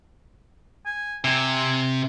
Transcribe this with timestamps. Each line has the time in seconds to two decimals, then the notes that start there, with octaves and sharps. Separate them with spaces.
0.86 G#5
1.24 C3 G#5